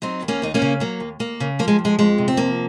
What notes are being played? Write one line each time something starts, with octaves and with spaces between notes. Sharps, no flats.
F#3 C4 D#4
D#2
A#3 C#4
D#2 D#4
A#3 C#4
C#3
F#3 A#3
D#2
D#2 A#3
C#3
F3 A#3
G#3
F2
G#3
F2 G#3
C3
C4
F3 A#3